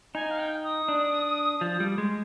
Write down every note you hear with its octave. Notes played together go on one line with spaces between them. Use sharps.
D#4 G#5
F5
G5
D#6
D4
F3
G3
G#3